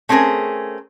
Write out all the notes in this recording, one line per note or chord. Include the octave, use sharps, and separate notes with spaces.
A3 C4 C#4 G#4 A#4